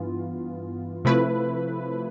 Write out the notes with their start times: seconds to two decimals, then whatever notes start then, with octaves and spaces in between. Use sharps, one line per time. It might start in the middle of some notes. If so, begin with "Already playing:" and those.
Already playing: G2 E3 B3 F4
1.05 C3 F3 A3 E4 B4